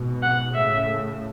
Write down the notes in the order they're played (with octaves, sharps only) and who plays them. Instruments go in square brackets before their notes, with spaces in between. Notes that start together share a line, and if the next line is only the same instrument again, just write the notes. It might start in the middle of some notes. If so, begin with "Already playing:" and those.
Already playing: [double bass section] G#2 B2
[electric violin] F#5
[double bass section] A2 C#3 [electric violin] E5